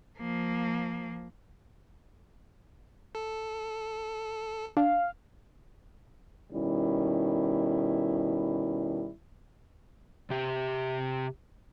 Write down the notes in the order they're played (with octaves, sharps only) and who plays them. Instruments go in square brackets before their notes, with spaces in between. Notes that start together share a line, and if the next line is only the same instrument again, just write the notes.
[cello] F3 A#3
[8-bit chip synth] A4
[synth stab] D4 [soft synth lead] F5
[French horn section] B2 D#3 G3 C#4 E4
[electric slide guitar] C3 G4